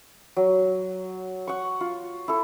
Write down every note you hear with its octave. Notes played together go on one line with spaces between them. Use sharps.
F#3
F#5 C#6
F4
E4 A4